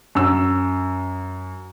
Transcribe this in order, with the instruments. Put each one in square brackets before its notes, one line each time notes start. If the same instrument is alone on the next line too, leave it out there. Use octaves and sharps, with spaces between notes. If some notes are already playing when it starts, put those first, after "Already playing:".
[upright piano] F#2 E6